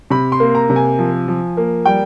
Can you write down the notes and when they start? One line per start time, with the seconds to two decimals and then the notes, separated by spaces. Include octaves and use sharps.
0.10 C3 B5
0.32 C6
0.40 A#3
0.55 A#5
0.70 C3
0.76 G#5
0.99 F3
1.28 F3
1.57 A#3
1.86 G3 G5